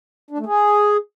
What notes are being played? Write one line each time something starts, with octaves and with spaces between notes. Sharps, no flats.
D4
A3
G#4